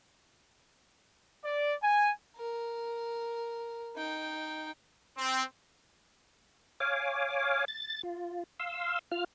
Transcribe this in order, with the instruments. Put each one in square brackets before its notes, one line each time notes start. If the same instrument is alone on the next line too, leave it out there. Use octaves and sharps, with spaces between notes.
[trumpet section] D5
G#5
[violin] A#4
D#4 G5
[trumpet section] C4
[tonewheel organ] C#5 F5 G#5 D6
A6
F4
F5 C6 E6
F4 F6